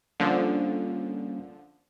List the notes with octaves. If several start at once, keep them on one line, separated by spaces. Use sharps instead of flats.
D3 F3 G3 A#3 C#4